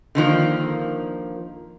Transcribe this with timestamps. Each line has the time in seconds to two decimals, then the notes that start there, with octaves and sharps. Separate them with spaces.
0.15 D3 D#3 F3 A#3